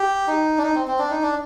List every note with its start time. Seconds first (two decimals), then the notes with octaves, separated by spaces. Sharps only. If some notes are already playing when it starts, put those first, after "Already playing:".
Already playing: G4
0.28 D#4
0.58 D4
0.63 D#4
0.75 C4
0.87 C4
0.99 D4
1.11 D#4
1.23 D4